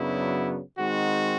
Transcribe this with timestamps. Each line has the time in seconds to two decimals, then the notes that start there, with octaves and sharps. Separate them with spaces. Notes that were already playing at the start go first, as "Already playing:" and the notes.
Already playing: F#2 C#3 F#3 B3 D4 E4
0.79 D#3 G#3 C4 D#4 F#4